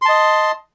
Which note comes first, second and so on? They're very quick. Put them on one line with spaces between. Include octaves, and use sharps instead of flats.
C6 A5 D#5